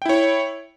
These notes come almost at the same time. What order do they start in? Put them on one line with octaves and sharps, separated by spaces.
G5 E4 C#5